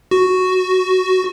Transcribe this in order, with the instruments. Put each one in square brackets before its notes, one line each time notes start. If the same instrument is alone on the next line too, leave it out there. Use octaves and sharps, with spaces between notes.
[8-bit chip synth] F#4